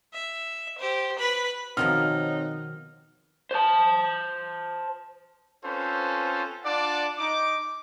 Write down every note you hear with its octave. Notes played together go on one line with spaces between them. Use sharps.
E5
G4 C5
B4 B5
B2 D#3 F3 C4 D#4 C#5 F#5 F6
C5 A5
C4 C#4 F4 A4 B4 C5
D4 F4 D5 F#5 A5 D6
D#4 D6